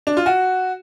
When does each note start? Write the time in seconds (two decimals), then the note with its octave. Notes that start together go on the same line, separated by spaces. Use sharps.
0.07 D4
0.17 F4
0.26 F#4